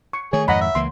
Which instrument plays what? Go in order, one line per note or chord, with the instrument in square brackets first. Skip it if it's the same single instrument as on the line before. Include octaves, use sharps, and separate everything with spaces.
[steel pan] C#6
[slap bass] D#3 A3 [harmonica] G#4 [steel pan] C#5
[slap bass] F2 G#2 D#3 [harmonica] D#5 [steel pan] F#5 A#5 B5
[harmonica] E5
[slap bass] C#2 E3 A#3 [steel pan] C6